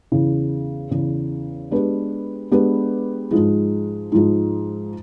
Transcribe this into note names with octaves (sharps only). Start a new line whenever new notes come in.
E2 C#3 E3
E2 C#3 E3
G#3 B3 D4 G4 B4
G#3 B3 D4 G4 B4
G#2 F3 G#3
G#2 F3 G#3